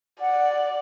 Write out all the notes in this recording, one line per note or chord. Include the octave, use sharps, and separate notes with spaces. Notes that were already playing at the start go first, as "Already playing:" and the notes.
D5 F#5